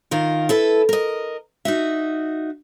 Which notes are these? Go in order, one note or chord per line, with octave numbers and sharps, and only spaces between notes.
D#3 F4 A#4
E4 A4 B4
A#4 D#5
D#4 F#4 E5